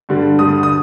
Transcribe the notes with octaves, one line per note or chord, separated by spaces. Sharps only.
G2 D3 G3
G2 D3 G3 D#6
D#6